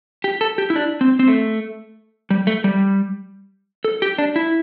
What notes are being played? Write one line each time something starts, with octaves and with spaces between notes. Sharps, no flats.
G4
A4
G4
E4
D4
C4
C4
A3
G3
A3
G3
A4
G4
D4
E4